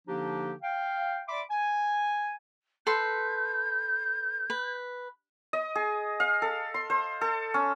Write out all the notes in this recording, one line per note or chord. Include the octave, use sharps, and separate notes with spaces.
D3 F3 A#3 D4 D#4 G4
F5 G5
D5 E5 B5 C6 D6
G#5
A4 B4 C6 G6
B4
D#5
G#4
F5
A4
C6
C5
A4
C#4